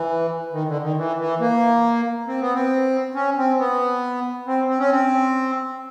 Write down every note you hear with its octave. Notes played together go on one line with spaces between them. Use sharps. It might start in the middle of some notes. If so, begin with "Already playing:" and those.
Already playing: E3
D#3
D3
D#3
E3
E3
A#3
C4
B3
C4
C#4
C4
B3
C4
C4
C#4
C4